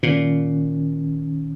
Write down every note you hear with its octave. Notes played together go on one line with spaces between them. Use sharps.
A#2 D#3 C#4